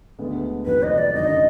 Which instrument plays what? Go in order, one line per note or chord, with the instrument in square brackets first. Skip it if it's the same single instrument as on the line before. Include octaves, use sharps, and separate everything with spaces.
[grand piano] D2 D3 G#3 B3
[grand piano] F1 F2 D#3 F#3 [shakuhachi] B4
[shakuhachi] D#5
D5
[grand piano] G#1 F#2 D3 F#3 [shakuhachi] D#5